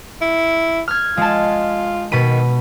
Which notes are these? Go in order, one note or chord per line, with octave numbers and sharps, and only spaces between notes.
E4
F6 G#6
G#3 F4 A5
B2 D#3 B5 D#7